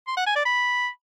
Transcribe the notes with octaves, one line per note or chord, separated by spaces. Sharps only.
C6
F#5
G#5
D5
B5